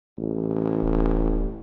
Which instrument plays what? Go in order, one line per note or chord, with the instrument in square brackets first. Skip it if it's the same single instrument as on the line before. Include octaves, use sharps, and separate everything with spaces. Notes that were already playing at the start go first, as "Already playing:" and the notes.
[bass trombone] A1
[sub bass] D1